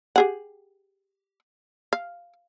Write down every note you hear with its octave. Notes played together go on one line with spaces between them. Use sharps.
G4 G#4 F#5
F5